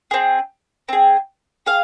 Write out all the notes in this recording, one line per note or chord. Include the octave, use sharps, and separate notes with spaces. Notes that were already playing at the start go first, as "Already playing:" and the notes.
C4 G#4
C4 G#4
G#4 F5